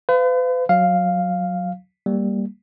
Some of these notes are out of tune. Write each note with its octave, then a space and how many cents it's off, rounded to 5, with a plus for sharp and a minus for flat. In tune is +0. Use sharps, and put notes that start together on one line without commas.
B4 +40 F5 -15
F#3 -10 F5 +0
G3 +5 A#3 +0